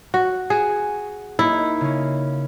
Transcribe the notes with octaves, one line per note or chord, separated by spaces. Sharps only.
F#4
F#4 G#4
A#3 D#4 E4
C#3 C#4